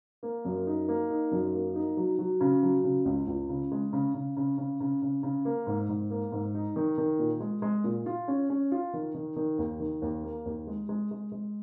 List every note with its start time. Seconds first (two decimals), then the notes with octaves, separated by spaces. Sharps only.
0.23 A#3
0.45 F#2
0.67 D#4
0.88 A#3
1.10 D#4
1.32 F#2
1.54 A#3
1.75 D#4
1.97 F#3
2.19 F#3
2.41 C#3
2.63 F#3
2.84 C#3
3.05 C#2
3.27 C#2
3.49 C#3
3.72 G#3
3.93 C#3
4.14 C#3
4.37 C#3
4.58 C#3
4.80 C#3
5.02 C#3
5.23 C#3
5.45 A#3
5.67 G#2
5.89 G#2
6.10 A#3
6.32 G#2
6.54 D#4
6.76 D#3
6.98 D#3
7.19 A#2
7.40 G#3
7.62 G#3
7.84 A#2
8.06 F4
8.28 C#4
8.50 C#4
8.72 F4
8.93 D#3
9.15 D#3
9.36 D#3
9.58 D#2
9.80 D#3
10.02 D#2
10.23 A#3
10.45 D#2
10.67 G#3
10.89 G#3
11.11 G#3
11.32 G#3